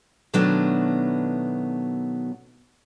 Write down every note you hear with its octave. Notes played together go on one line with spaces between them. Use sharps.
B2 D#3 F#3 A3 B3 D4